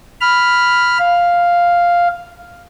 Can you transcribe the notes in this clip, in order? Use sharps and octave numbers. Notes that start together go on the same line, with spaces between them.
B5 F6
F5